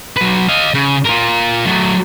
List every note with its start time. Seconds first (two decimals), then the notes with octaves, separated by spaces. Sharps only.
0.17 F#3 B4
0.49 D#5 F5
0.74 C#3
1.05 F4 A#4
1.66 F#3 A3